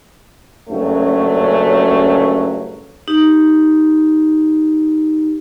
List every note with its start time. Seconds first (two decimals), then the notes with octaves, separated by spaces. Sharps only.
0.69 F#1 G2 F#3 A3 C#4
3.08 D#4 G4